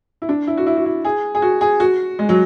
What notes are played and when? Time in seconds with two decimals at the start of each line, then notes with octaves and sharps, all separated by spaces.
0.22 E4
0.29 D4
0.47 E4
0.57 F#4
0.67 E4
0.77 F#4
0.85 E4
1.04 G#4
1.35 G#4
1.42 F#4
1.61 G#4
1.80 F#4
2.19 G#3
2.29 F#3